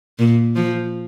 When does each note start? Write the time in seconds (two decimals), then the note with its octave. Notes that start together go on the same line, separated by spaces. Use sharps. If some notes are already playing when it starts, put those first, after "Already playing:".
0.19 A#2
0.56 F3